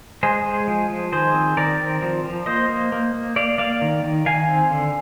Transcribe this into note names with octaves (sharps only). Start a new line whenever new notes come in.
G#3 G#4 C5
G#3
F3
F3
D#3 G#4 C5
C4
D#3 A#4 D5
C4
F3
F3
A#3 C5 D#5
A#3
A#3
A#3
A#3 D5 F5
A#3 D5 F5
D#3
D#3
D#3 F5 G#5
C4
D3